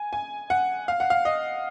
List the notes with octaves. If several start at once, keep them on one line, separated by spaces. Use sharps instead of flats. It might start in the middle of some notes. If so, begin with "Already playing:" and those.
Already playing: G#5
G#5
F#5
F5
F#5
F5
D#5